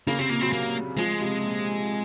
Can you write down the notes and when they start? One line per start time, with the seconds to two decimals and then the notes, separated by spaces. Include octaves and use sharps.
0.07 C#3 A#3
0.19 C3 C4
0.30 A#2 A#3
0.41 F#3 C4
0.53 A#3
0.97 F3 G#3
1.21 C3
1.43 A#2